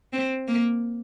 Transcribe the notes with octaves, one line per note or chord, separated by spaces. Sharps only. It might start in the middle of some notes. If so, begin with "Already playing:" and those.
C4
A#3